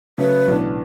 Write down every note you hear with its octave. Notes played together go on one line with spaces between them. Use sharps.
C#3 F#3 A3 C#4 B4
B1 A2 E3 B3 D4